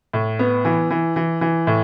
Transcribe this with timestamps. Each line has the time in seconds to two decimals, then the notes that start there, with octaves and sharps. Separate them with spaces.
0.13 A2
0.39 B3
0.65 E3
0.90 E3
1.16 E3
1.41 E3
1.67 A2